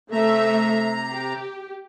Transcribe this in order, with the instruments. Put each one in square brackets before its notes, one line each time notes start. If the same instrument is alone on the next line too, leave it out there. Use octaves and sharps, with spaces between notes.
[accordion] C3 A#5 [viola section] A3 E5
[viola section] G4